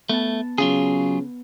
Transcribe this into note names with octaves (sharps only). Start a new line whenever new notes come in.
A3 B3 A5
C#3 F#3 F4 G#4